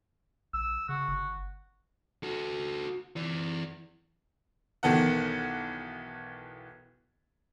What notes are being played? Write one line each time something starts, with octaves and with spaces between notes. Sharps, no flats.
A#1 E6
C#3 F#4
G1
F#4 A4
E3 D5
B1 D#3 E3 B3 A4 F#5